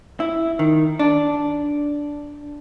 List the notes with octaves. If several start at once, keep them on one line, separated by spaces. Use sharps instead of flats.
E4
D#3
D4